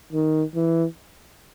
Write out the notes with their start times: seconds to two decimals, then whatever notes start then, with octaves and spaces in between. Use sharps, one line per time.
0.13 D#3
0.55 E3